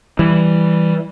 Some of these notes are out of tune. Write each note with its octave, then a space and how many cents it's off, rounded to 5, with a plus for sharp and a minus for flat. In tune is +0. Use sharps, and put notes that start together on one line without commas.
E3 +0 G3 +0